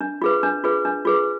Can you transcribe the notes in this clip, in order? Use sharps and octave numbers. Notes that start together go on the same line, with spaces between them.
D4
F4 G#4 B4
D4
F4 G#4 B4
D4
F4 G#4 B4